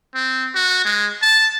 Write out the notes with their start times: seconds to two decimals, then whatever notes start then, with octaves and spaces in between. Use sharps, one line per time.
0.15 C4
0.55 F#4
0.85 G#3
1.22 A5